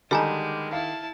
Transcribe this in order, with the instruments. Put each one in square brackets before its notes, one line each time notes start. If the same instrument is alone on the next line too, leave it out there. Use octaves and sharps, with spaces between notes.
[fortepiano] D3 G3 B5 [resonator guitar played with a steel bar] D#3 [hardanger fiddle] G#3 [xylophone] D#5 G#5 A#5
[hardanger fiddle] E4 A5 [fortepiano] F5